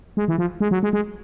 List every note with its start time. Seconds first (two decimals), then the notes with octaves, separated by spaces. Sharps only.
0.17 G#3
0.28 E3
0.38 F3
0.61 G#3
0.71 F#3
0.83 G#3
0.93 G#3